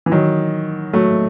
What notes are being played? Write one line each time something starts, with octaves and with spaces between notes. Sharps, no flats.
E3
D#3 F#3
F#3 A3